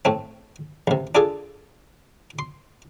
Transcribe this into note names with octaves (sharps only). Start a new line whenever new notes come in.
A2 A3 C4
A1 C3
D4 F4 G#4 A4
C6